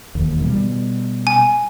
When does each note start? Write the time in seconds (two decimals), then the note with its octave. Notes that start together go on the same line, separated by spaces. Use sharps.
0.15 E1 D#2
0.42 B2 G3 B3
1.27 G#5